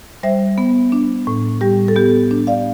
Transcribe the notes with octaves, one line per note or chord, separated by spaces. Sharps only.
G3 C5 E5
B3
D4
A2
G3 G4
A4
B3 G4
D4
D5 F5